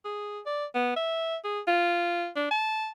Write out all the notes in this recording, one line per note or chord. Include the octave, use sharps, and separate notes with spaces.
G#4
D5
B3
E5
G#4
F4
D4
A5